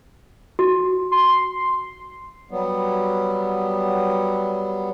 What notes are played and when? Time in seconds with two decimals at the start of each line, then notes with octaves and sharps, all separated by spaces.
0.59 F#4
1.12 C6
2.51 F#3 G3 B3